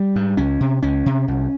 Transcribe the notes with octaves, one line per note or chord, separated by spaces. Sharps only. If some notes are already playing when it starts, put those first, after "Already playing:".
Already playing: G3
G#2
C#2 C#4
C3
C#2 C#4
C3
C2